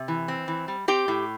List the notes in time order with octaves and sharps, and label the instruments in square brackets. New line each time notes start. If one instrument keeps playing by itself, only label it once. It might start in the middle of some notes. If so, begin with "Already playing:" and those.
Already playing: [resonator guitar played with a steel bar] C3
E3
C4
E3
G3
C4 G4 G5
A2